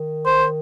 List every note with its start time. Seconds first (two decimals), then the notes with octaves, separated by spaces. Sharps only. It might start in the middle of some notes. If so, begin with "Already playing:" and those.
Already playing: D#3
0.26 C5